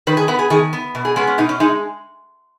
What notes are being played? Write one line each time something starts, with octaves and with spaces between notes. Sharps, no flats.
D#3 B4
G#4
B3 B4
G#4
D#3 G#4
B3
B2
G#4
G#3 B3 C#4
C#4
B2 D#4
C#4
G#3 D#4